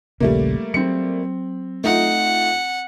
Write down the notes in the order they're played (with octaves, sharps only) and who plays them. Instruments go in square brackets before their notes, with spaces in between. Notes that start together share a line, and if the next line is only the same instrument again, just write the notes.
[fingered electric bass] D#1 A#1 C#3 [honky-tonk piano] G3 A3 A#3
[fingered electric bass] F#3 [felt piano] C4 C#7
[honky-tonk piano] A3 D#4 F4 [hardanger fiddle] F#5